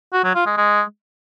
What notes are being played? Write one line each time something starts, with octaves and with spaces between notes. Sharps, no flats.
F#4
F#3
F4
G#3
G#3